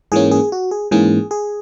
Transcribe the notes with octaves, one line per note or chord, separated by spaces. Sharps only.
G#2 E3 A#3 C#4 G#4
G#4
F#4
G#4
G#2 E3 A#3 C#4 G#4
G#4